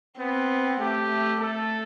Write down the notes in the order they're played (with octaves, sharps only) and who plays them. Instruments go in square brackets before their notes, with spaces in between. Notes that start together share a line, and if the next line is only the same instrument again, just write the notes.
[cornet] B3 [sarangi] C4
[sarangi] A3 [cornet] G4
[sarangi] A3
[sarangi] A3 [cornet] A4